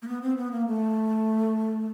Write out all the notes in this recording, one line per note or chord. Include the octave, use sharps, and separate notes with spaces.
A#3
B3
C4
B3
A#3
A3